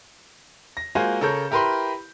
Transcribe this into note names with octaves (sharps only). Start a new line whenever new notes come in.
A#6
G#3 A#3 F4 F#4 C5 G#5
C#3 A4 A#4 C#5 G6
E4 G4 A#4 B4 B5 C6